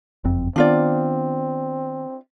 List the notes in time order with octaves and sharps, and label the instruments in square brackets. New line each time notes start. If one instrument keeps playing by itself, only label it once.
[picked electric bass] F#1 F2 C4
[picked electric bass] D#3 B3 [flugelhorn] C4 [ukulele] D4 F4 D5